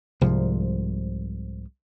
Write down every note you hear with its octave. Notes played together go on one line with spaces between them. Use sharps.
C2 G#2 F3